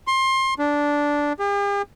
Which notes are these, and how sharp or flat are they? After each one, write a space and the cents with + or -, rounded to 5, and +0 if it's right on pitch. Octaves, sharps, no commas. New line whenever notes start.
C6 +25
D4 -10
G4 +45